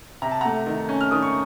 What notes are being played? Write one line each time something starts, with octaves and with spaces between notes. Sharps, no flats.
C3 A#5
A5
A3 F#5 A#5
D#3
C#4
F6
D#3 D#6
C#6